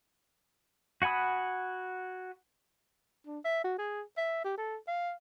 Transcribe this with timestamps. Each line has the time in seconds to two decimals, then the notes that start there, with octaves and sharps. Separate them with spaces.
1.02 F#4 F#5 G#5 B5 D#6
3.27 D4
3.45 E5
3.64 F#4
3.79 G#4
4.17 E5
4.44 G4
4.58 A4
4.88 F5